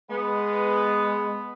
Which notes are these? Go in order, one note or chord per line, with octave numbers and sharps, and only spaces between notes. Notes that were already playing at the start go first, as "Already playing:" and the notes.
G#3 B3